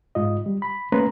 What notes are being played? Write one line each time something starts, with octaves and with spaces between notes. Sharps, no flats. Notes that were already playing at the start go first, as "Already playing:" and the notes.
G#2 F4 D#5
G3
B5
A3 A#3 C#4 B4 A#5 C6